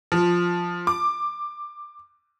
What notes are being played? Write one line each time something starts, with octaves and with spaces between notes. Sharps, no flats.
F3
D6